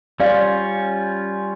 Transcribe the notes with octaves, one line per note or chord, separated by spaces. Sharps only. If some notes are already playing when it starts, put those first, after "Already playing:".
G3 C#4 F4 D5 F5